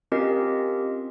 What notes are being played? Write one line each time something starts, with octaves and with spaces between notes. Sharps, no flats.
C4 C#4 F4 G4 A#4 D#5